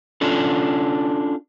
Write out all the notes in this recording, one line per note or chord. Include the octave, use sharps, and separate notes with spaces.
C#4 D4 F4 A4